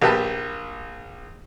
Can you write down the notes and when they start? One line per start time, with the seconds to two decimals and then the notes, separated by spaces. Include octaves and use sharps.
0.02 A#1 A#3 G4 B4 A5